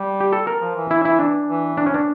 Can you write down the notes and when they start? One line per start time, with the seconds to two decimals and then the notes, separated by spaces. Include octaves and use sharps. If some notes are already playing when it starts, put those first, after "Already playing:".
Already playing: G3
0.20 G4
0.33 A4
0.47 A#4
0.61 F3
0.76 E3
0.91 E4
1.05 E4
1.20 D4
1.48 E3
1.77 D4
1.86 C#4
1.94 D4